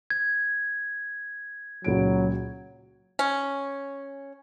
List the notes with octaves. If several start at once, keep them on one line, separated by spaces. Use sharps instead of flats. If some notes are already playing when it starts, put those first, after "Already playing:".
G#6
C#2 A#2 F#3 D7
C#4